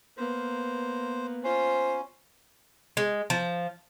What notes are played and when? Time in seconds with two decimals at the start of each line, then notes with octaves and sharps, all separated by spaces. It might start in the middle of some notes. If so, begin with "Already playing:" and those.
0.17 A#3 B3 C5
1.44 C#4 F4 C5
2.97 G#3
3.30 F3